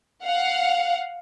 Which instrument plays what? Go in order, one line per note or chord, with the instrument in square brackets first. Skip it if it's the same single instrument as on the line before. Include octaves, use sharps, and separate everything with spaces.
[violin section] F5 F#5